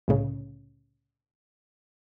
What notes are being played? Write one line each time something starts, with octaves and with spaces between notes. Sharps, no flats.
C2 A2 C#3 C#4